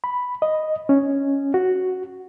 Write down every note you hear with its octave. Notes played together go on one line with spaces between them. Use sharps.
B5
D#5
C#4
F#4